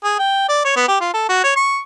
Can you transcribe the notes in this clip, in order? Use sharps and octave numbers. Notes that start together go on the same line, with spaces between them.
G#4
G5
D5
C#5
B3
G4
F4
A4
F#4
C#5
C#6